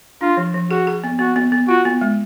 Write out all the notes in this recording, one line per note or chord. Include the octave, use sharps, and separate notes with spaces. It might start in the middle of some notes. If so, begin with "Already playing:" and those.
D4 F4
F3
F3
F#4 G#4
G#4
B3
B3 F#4
B3
B3
F4 F#4
B3
G#3